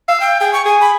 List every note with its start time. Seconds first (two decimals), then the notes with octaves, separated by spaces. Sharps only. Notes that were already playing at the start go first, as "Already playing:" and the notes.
0.08 F5 E6
0.20 G5
0.41 G#4 G5
0.53 C#6
0.65 G#4 G#5
0.81 B5